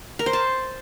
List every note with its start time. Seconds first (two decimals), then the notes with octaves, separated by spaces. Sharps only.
0.19 A#4
0.26 C5
0.33 A5